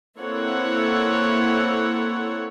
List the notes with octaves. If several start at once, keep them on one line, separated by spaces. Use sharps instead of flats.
A#3 C4 E4 A4 C#5 F#5